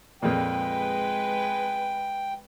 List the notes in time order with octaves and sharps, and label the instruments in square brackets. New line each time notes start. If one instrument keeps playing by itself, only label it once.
[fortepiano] F2 A#2 [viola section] G#3 B4 [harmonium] G5